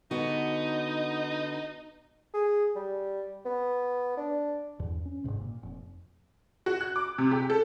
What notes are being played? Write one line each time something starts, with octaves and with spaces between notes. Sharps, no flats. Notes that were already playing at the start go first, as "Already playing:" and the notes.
D3 B3 D#4 F#4
G#4
G3
B3
D4
E2 G2
C#4
G1 D2 G#2 C3
A#2
F1
F#4
F#6
D6
C3
G4
A4